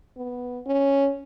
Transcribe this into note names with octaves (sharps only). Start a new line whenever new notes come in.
B3
C#4